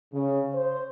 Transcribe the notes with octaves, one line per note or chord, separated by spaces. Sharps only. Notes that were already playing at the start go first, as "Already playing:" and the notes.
C#3
C5